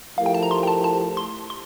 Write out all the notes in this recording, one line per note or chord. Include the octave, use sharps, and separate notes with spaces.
F3 A3 E4 G4 A#4 F5
G5
A5
A#5
C6
G5
A5
A5
C6
C6